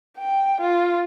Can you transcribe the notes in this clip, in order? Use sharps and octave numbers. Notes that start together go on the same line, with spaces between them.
G5
F4